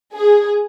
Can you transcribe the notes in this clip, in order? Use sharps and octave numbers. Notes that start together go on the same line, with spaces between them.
G#4